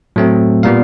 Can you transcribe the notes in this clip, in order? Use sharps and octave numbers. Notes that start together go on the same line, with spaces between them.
A2 F#3 A3 C4
A#2 G3 B3 F5